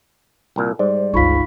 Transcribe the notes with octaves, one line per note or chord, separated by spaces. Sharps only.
C2 A#2
G#2 G3 C5 D5
G1 C#2 D#4 F4 F5 B5 C#6 B6